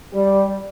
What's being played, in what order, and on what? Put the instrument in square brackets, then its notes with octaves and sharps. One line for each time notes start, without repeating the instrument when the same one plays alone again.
[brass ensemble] G3